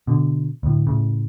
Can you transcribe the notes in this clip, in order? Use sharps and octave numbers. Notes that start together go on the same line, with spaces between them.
B2 D3
D2 A2
A2 C#3